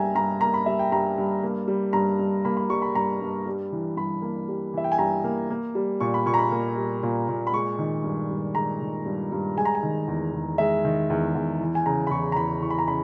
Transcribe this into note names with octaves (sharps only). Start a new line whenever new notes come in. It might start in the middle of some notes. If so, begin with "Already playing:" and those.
Already playing: G2 G3 A#3 E5 G5 G#5 A#5
G2 A#5
A#3 A#5
B5
G3 E5
G5
G2 A#5
G2
A#3
G3
G2 A#5
G2
A#3 B5
B5
G3 C#6
B5
G2 A#5
G2
G3
E3
G2 B5
A#3
G3
E3 E5
G5
G#5
G2 A#5
A#3
A#3
G3
A#2 C#6
B5
A#2 C#6
A#5
B5
A#3
G3
A#2
A#2
B5
G#3 C#6
D#3
G2
G2
G#3 A#5
D#3
G2
G2
G#3 G#5
A#5
G#5
D#3
E2
E2
G#3 E5
D#3
E2
E2
E3
G#5
C#3 A#5
B5
E2 C#6
A#5
E2 B5
E3 C#6
B5
A#5
C#3 B5